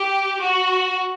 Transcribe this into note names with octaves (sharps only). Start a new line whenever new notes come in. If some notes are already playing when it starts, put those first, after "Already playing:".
Already playing: G4
F#4